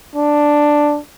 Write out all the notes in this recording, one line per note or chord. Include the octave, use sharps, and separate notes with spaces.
D4